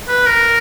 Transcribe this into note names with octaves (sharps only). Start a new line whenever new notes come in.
B4
A#4